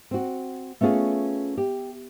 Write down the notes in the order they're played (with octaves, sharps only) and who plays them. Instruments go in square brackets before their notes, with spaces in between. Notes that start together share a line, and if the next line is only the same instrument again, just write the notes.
[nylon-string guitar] C4 F#4
A3 B3 C#4 F4 G#4
G4